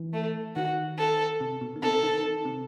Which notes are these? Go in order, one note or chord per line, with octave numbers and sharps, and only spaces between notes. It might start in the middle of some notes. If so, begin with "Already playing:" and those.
Already playing: E3
A3
D#3 F#4
A4
C3
B2
D#3
C3 A4
D#3
D#3
C3